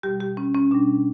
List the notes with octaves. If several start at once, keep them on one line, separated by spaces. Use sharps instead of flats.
B2 G3 G4
G4
C#4
C#4
B2 G3 D4